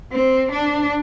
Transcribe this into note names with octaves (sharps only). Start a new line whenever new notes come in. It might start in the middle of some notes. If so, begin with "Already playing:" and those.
C4
D4